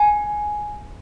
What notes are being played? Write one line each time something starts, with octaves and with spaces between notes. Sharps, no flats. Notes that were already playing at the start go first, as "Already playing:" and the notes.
Already playing: G#5